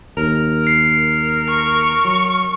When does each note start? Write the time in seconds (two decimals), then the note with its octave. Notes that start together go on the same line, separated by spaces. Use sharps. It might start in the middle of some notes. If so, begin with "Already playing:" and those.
0.17 D#2 A#4
0.67 C7
1.49 C#6
2.05 F#3